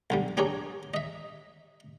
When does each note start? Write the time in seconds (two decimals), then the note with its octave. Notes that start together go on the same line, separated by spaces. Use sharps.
0.10 B1 D3 G3
0.37 D4 G4 G#4 A#4 C#5
0.94 D#5 E5